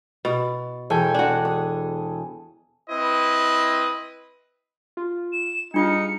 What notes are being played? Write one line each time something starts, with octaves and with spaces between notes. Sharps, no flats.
B2 A6
E1 A4 G5 G#5
D4 F#4
D#6
C4 E4 B4 D#5
F4
E7
G3 D4 D#4 F4 G#4 F5 C#7